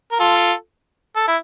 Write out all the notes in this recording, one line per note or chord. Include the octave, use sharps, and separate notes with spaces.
A#4
F4 A4
A4
E4